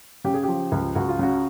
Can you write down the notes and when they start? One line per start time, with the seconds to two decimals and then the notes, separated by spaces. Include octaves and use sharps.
0.24 C#3 G4
0.34 G#4
0.43 F3 G4
0.72 C#2
0.95 C#2 F#4
1.09 F4
1.19 C#3 F#4